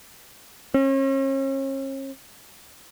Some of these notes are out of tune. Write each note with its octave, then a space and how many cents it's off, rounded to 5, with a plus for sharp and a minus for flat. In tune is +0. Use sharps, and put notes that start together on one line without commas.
C#4 -40